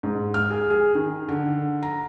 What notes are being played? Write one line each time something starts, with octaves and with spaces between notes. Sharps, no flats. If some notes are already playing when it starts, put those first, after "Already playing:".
G#2
F6
G#4
G#4
D#3
D3
A#5